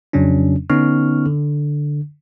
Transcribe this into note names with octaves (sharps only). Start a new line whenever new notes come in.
F2 C#3 F#3 C#4 D4
D3 B3 C#4 D#4 C#6 F6
D3